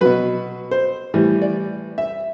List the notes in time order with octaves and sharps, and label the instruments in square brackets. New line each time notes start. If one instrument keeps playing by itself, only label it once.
[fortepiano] B2 F#3 B4
C5
A2 E3 G3
D5
E5